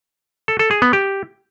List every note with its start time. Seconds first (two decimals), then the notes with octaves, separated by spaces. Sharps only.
0.48 A4
0.59 A4
0.71 G#4
0.82 B3
0.93 G4